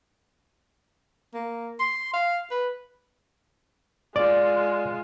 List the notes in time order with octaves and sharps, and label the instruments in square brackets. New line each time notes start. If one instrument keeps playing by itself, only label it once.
[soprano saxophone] A#3
C6
F5
B4
[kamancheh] G#3 F4 [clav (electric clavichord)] D5